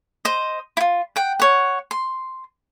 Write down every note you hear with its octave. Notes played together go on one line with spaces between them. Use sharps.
C5 D#5
E4 F4
F#5 G5
C#5 F#5
C6